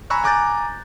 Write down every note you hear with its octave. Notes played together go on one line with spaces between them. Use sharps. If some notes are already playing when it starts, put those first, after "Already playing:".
G#5 A#5 B5 C#6 E6 F#6
G#5 A#5 D6 F#6 G6 A6